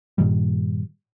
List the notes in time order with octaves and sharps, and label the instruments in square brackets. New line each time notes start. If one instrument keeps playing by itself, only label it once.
[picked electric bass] G2 A#2 D#3 G3